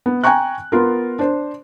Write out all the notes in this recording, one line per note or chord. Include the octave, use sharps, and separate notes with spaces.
B3
G5 G#5 A#5 C#6 F#6
B3 F4 A#4
D4 C5